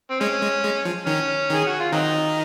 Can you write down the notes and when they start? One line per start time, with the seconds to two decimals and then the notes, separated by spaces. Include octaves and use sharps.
0.11 C4
0.20 G#3 C#4
0.42 G#3
0.64 G#3
0.85 F3
1.07 D#3 C#4
1.50 D#3 G#4
1.67 F#4
1.80 F4
1.92 D#3 F#3 C4 D#4